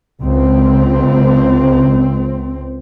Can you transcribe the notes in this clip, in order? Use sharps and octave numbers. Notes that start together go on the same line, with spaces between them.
C#2 C4